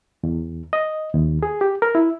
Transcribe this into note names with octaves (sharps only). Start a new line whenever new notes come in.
E2
D#5
D#2
G#4
G4
A#4
E4